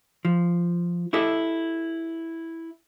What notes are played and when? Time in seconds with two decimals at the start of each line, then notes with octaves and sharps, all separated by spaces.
0.25 F3
1.13 E4 G4 A4 D#5 E5